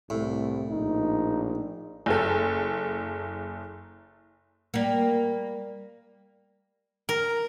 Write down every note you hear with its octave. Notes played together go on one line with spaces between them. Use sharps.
C2 A2
A#1 D#4
F#1 A4
G3 A#3
A#4